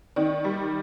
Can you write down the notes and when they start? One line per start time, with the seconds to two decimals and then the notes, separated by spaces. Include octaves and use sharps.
0.16 D#3 D5
0.44 G3